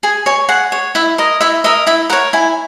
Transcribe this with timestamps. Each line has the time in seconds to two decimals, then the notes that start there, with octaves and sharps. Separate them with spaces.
0.03 G#4 G#5
0.26 C#5 G#5
0.49 G#4 F#5
0.72 C#5
0.95 E4 E5
1.18 A#4 D#5
1.41 E4 E5
1.64 A#4 D#5 E5
1.87 E4 E5
2.10 A#4 F#5
2.13 C#5
2.33 E4 G#5